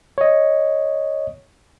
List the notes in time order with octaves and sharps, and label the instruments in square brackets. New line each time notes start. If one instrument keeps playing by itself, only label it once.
[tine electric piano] C#5 D#5